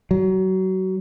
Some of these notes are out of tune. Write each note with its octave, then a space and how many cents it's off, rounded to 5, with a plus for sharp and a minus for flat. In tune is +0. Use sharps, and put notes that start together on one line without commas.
F#3 +25